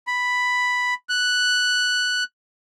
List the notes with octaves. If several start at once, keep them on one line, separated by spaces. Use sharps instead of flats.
B5
F#6